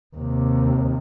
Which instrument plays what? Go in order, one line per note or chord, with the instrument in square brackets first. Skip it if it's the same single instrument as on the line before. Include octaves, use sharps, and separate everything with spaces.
[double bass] D#2 C3